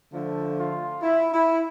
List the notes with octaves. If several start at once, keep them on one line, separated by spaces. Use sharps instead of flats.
D3 F3 A3
F4
E4
E4